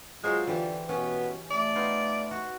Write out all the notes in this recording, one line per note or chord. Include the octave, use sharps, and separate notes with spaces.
F#3 G#3 F4 C5
D3 E3 G4
B2 B3 C#4
A3 D5
B3 D#4 F4
F#4